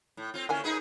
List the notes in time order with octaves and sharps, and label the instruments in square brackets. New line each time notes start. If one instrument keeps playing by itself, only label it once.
[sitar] A2
C4 F4
[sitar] D3 C#4 [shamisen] A#3 E4 G#5
[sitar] D#4 G#4 B4